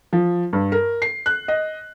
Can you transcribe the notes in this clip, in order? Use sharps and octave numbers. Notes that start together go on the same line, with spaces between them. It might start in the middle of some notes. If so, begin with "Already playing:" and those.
F3
G2
A#4
C7
F#6
D#5